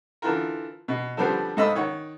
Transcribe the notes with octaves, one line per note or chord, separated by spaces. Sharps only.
D3 E3 F4 A#4
B2
D3 F3 G3 B3 C5
G#2 A4 D#5 F5 B5 E6
D#3 C#5 F#5